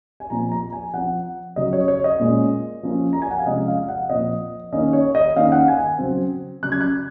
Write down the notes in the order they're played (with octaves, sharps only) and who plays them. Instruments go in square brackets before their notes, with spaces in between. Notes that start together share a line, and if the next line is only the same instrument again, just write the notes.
[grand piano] G#5
A#2 F3 C4 A#5
A#5
G#5
F3 C4 F#5
C#3 F#3 C#4 D#5
C#5
C#5
D#5
A#2 G#3 C#4
F3 A#3 C#4
A#5
G#5
F#5
F5
C3 F3 G#3 C#4 D#5
F5
F#5
A#2 F3 C4 D#5
D#3 A#3 C#4 D#5
C#5
D#5
D#3 A#3 C#4 F5
F#5
G#5
C#3 F#3 C4
C#3 F#3 C#4 F#6
G#6
F#6